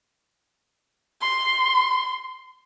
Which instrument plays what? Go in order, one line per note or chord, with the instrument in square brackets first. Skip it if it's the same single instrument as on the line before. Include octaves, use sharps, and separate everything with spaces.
[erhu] C6